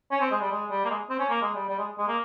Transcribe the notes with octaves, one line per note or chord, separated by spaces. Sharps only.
C#4
C4
G#3
G3
G#3
G3
A#3
G#3
C4
C#4
A#3
G#3
G3
G3
G#3
G#3
A#3